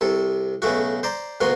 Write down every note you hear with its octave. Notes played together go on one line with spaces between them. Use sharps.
C2 C3 A4
B1 C#3 A3 F#4
C5 D5 A#5
D2 B2 A#3 F#4 C6